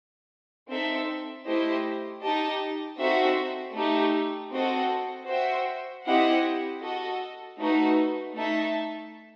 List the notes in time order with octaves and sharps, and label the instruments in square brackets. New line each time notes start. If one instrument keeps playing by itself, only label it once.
[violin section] C4 D#4 A4 E5
A3 E4 G4 C5 D#5
D#4 G4 D#5 A5
C4 D#4 F#4 A4 E5
A3 D#4 G4
C4 F#4 A4 D#5 F#5
F#4 C5 E5 G5
C4 E4 G4 D#5 F#5
F#4 A4 D#5
A3 D#4 F#4 B4
A3 D#4 A4 E5 A5